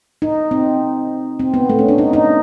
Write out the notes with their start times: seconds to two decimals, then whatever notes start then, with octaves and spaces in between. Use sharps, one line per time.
0.22 D#4
0.51 C4
1.39 C4
1.54 B3
1.69 A3
1.79 C#4
1.88 D4
1.98 D#4
2.13 D#4